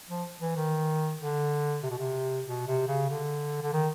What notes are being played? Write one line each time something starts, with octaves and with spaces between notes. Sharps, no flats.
F3
E3
D#3
D3
C3
B2
C3
B2
C3
C#3
D3
D3
D#3